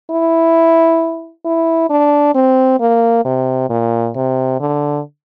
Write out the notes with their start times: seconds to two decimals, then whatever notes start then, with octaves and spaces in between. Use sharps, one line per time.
0.11 E4
1.45 E4
1.90 D4
2.35 C4
2.80 A#3
3.25 C3
3.70 A#2
4.15 C3
4.60 D3